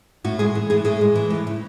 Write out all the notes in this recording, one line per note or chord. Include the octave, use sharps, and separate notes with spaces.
A2 F#4
G#3 G#4
E3
A2 G#4
A2 G#4
G#3
E3
A2
C#3